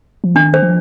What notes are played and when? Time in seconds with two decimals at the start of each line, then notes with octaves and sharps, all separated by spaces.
0.24 F3
0.35 D#3 D4
0.54 C5
0.62 F3